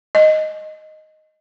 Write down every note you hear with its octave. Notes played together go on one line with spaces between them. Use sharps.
D#5